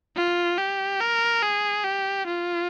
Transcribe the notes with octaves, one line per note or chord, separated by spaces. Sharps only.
F4
G4
A#4
G#4
G4
F4